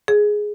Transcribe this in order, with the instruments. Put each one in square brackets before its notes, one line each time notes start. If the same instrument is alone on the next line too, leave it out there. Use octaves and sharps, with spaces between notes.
[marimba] G#4